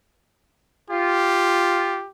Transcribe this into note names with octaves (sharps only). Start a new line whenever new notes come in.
F4 G4